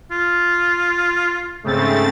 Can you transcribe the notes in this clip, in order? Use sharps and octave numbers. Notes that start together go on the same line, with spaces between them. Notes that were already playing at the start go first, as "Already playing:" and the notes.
F4
G#2 C#3 A3 C4 A6